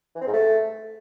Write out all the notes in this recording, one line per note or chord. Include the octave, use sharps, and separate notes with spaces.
E3
C4
G#2
A3